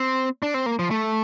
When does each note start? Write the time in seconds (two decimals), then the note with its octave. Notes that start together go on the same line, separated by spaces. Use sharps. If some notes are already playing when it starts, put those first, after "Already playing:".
Already playing: C4
0.42 D4
0.54 C4
0.66 A#3
0.79 F3
0.91 A3